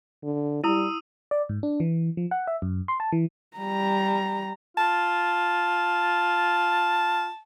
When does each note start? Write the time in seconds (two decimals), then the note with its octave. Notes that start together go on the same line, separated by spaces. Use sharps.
0.23 D3
0.64 G3 E4 D#6 E6 D#7
1.31 D5
1.49 G#2
1.63 D4
1.80 E3
2.17 F3
2.31 F#5
2.47 E5
2.62 F#2
2.88 C6
3.00 A5
3.12 E3
3.57 G3 A#5
4.77 F4 A5